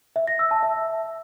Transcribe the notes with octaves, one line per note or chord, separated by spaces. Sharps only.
E5
A#6
E6
A5
E5